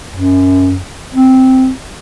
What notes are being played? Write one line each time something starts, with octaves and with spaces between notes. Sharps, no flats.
F#2
C4